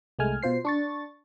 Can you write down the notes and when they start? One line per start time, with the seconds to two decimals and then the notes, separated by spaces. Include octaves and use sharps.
0.19 C2 G#3 A3 G#5 F6
0.43 B2 F4 C5 C7
0.65 D4 C#6 A6